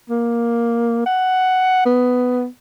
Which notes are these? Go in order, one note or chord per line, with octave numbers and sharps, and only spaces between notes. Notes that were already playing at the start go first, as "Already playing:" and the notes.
A#3
F#5
B3